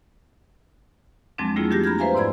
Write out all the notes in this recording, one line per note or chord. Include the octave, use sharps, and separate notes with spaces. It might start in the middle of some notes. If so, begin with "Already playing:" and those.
F2 F3 F#3 G#3 C4 D4
G3 A3 A#3 E4 F4 G#4
F3 D4 F#4 G4 G6 A#6
A#5 B5 F6 G6 G#6
B4 C5 E5 F5 G#5 A#5
G#2 E4 D5 B5 G#6